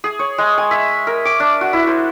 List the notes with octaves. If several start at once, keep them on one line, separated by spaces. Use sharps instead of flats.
G#4
C#5
G#3
G#5
E5
A#4
D6
D4
F#4
E4
C5